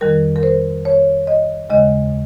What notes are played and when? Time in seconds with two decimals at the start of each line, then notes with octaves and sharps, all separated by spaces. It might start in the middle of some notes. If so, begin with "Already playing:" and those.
0.01 F2 D#3 G3 A#4
0.36 A#4
0.43 C5
0.85 C#5
1.27 D#5
1.70 D#2 C#3 G#3 D#5